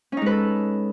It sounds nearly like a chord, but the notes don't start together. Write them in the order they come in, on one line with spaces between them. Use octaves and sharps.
C#4 D#4 G#3 B4 A4